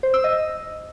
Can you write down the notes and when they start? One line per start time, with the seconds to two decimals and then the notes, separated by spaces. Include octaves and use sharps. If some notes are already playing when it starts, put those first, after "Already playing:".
0.03 C5
0.14 E6
0.24 D#5